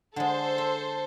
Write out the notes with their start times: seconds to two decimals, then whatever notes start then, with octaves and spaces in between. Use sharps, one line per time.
0.16 D3 G#3 A4 C5
0.58 E5